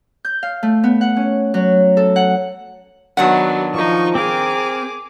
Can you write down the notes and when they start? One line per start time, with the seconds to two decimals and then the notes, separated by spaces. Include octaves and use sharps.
0.25 G6
0.43 F5
0.63 A3
0.84 B3
1.01 F#5
1.16 C#4
1.54 F#3
1.97 A4
2.16 F#5
3.17 D#3 F#3 B3 D4 F#5
3.74 F3 D#4 C#6
4.15 C4 G#4 A#4 D6